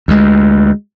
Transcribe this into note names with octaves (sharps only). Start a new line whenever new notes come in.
D2 G#3